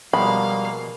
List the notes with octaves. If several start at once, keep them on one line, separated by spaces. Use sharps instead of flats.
B2 F3 G3 G#3 A#3 F5 B5